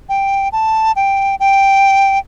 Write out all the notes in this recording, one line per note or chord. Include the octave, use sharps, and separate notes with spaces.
G5
A5
G5
G5